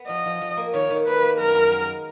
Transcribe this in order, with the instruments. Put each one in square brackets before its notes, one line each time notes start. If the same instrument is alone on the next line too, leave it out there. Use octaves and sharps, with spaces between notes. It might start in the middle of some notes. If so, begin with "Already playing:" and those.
Already playing: [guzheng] B3
[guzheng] F3 [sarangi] D#5
[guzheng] F3
F3
A#3
[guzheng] D#3 [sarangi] C#5
[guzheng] D#3
[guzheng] A#3 [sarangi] B4
[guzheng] A#3
[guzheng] F#2 [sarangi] A#4
[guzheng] F#2
G#3